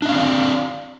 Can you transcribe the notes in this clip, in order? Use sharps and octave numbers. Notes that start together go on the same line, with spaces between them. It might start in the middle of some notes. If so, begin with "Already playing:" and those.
C4 D4 D5 D#5 F5